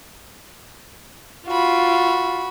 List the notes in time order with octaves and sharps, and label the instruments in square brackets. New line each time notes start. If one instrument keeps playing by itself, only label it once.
[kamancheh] F4 [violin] F#4 B5